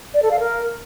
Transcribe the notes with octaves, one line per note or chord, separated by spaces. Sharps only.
D5
A4
F5
A#4